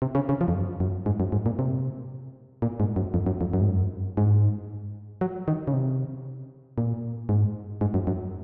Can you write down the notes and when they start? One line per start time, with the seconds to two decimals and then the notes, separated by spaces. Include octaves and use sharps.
0.02 C3
0.15 C#3
0.29 C#3
0.41 F3
0.48 F2
0.55 F#2
0.80 F#2
1.06 G#2
1.20 F#2
1.32 G#2
1.46 A#2
1.59 C3
2.62 A#2
2.80 G#2
2.96 F#2
3.14 F2
3.26 F#2
3.41 F2
3.53 F#2
3.61 G#2
3.68 F#2
4.17 G#2
5.21 F#3
5.48 D#3
5.68 C#3
5.74 C3
6.78 A#2
7.29 G#2
7.81 G#2
7.94 F#2
8.07 F#2